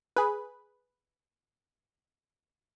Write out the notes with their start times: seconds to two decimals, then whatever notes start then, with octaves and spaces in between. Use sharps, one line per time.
0.16 G#4 B4